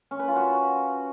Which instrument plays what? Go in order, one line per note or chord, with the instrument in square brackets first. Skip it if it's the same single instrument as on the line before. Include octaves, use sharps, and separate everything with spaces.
[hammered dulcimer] C#4
B4
F4
F#4